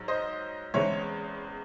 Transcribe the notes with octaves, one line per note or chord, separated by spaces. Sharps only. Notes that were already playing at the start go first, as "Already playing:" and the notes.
Already playing: G#2 F#3
C5 D#5
E2 C#3 E3 G#3 C4 C#5 E5